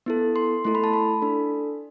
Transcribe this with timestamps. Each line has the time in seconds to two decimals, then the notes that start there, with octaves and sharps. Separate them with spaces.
0.06 B3 E4 A4
0.36 C6
0.65 A3 E4 A4 C6
0.75 B5
0.84 A5
0.93 B5
1.22 D4 A4